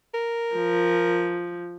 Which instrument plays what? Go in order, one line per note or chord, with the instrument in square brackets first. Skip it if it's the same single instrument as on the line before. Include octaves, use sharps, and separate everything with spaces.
[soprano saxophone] A#4
[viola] F3